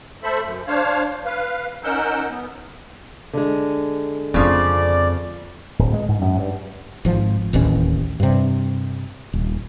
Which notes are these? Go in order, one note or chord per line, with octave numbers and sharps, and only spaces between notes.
A3 A4 C5 E5 B5
F#2
D4 C5 C#5 F5
B4 F5
C#4 D#4 A#4 F#5 E6 G6
B3
D3 G#3
F2 C#3 F3 C4 D5
D1
G#3
G#2
F#2
G2
G#1 F3
D1 A1 D#2 C#4
G2 C3
D#1